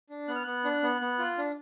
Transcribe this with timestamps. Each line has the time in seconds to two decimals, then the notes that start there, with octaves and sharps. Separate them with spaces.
0.10 D4
0.28 B3 F#6
0.35 F6
0.43 B3 F#6
0.64 D4
0.83 B3
1.01 B3
1.19 F4
1.38 D4